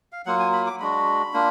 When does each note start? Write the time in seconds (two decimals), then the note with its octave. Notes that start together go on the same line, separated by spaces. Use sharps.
0.12 F5
0.26 F#3 A#3 F4 F#5
0.39 G#5
0.53 B5
0.66 D6
0.80 G#3 D4 F#4 B5
1.34 A#3 D4 F4